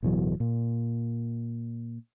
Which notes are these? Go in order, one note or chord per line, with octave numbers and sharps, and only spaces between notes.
D1 B2 E3 F#3
A#2